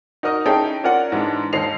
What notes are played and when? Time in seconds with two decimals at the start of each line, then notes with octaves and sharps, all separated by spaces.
0.23 D#4 F#4 A#4 D#5 D#6
0.46 C#4 D#4 E4 G#4 A4 G5
0.84 C#4 F4 A#4 C#5 D5 F#5
1.12 G#2 E3 G#3 D4
1.53 D#2 G#2 A4 D#5 C7 F7